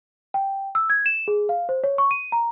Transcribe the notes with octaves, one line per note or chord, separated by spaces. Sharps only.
G5
E6
G#6
E7
G#4
F5
C5
C#5
C#6
D#7
A#5